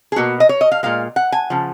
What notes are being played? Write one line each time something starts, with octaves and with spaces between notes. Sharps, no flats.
G#4
B2 A#3 F#4
D#5
C#5
D#5
F5
A#2 G#3 F5
F#5
G#5
C#3 F3